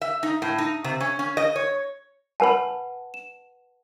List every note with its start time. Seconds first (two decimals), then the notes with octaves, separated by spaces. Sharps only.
0.01 E5
0.23 D#4
0.42 A2
0.58 D#4
0.84 C3
1.00 C#4
1.19 C#4
1.37 D#5
1.56 C#5
2.40 B4 F#5 G#5 A5 B5
3.14 E7